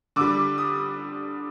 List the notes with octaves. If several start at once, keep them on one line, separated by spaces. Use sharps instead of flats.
D3 G3 D6
D#6